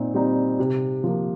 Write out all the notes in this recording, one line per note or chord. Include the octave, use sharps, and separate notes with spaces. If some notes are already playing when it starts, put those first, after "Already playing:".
Already playing: A#2 C4 D#4
G3 C4 D#4
C3
F3 A#3